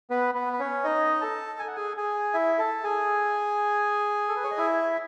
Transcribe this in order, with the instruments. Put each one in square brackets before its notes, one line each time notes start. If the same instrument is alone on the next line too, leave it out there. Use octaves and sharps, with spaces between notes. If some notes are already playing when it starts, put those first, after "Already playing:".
[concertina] B3 B4
B3 B4
B4
C#4 C#5
D#4 D#5
A4 A5
G#5
F#5
G#4 G#5
G#4 G#5
E4 E5
A4 A5
G#4 G#5
A4
B4
C#5
D#5
E4 E5